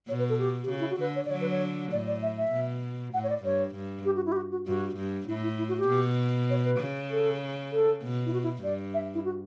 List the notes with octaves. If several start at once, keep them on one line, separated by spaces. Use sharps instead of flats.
B2 C#5
B4
A4
G4
G4
C#3 F#4
E4
F#4
D3 B4
C#5
D5
D3 F#3 C#5
B4
C#5
A2 D5
D5
E5
E5
B2
A2 F#5
C#5
D5
G2 C#5
G2
G4
F#4
E4
G4
F#4
F#4
G2 F#4
G2
A2 E4
E4
E4
F#4
G4
B2
C#5
B4
C#3
A4
A4
B2
E4
F#4
E4
G2 D5
E5
E4
F#4